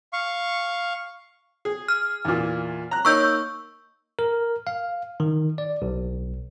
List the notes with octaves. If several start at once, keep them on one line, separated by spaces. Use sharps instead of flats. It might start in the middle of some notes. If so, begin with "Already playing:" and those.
F5 C#6
G#4
F6
E2 A#2
A#5 F#6
A#3 D#4 C#5 C#6 E6 G6
A#4
F5
D#3
D5
B1